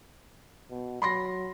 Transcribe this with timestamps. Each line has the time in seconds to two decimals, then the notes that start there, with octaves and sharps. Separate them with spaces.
0.70 B2
1.02 F#3 B5 C6 A#6